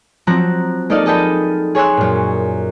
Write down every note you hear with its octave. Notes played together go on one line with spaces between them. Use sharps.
F3 F#3 C4 A#5 F#6
A#3 D#4 A4 D5 D#5 F5
G#4 A4 D#5 G5 A5 B5
G#4 C#5 G#5 C6 E6 F#6
F#2 A#2